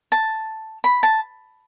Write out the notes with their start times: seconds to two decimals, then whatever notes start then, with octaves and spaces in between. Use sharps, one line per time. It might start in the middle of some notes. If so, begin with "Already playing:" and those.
0.12 A5
0.84 B5
1.03 A5